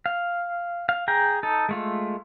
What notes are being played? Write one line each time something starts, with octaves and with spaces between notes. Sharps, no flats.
F5
F5
G#4 G5 A#5
D#4 A4
G#3 A3 F4